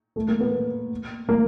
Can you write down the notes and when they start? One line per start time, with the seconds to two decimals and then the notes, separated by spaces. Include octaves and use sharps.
0.16 A3
0.28 A#3
0.40 B3
1.29 A#3